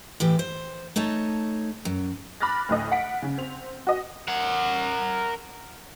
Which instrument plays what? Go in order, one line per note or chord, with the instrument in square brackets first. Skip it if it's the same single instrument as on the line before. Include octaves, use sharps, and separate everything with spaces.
[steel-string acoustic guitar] A2 E3 G4
C5
A3 D#4 C#5 A5
F#2
[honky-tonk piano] B5 D6 F6 F#6 A6 A#6
D2 A2 D#5
F#5 B6 D7
C#3
C4 F7
F#4 D#5
[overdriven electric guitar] A#4 F#5